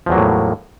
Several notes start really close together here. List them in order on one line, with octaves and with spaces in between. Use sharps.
F3 E2 F#3 A#3 A2